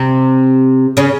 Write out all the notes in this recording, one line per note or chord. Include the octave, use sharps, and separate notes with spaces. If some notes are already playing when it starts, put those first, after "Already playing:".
Already playing: C3 C4
C#3 C#4